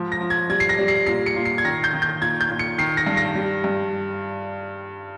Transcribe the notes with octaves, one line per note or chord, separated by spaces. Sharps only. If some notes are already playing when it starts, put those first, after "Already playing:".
Already playing: G#2 F3
A#6
F3
G#6
G3 G#6
C7
A#6
G3
C7
A#2 C7
C#7
A#2
C7
G#6
D#3 A#6
G6
D#3
G6
A#2 G#6
G6
A#2
C#7
D#3 C7
A#6
G2
A#6
G3
G2